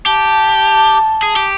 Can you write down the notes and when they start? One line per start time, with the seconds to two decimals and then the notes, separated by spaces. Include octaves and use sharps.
0.06 G4 A5
1.23 G#4
1.36 G4